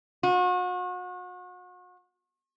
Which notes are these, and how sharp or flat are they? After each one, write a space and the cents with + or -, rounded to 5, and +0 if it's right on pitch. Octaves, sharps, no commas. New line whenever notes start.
F#4 -40